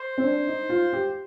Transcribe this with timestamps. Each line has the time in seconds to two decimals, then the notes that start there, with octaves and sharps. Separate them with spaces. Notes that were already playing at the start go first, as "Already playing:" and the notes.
Already playing: C5
0.18 C4
0.24 D4
0.47 D#4
0.69 F4
0.93 G4